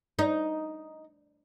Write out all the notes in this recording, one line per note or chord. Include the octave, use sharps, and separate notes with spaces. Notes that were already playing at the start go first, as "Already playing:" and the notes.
D#4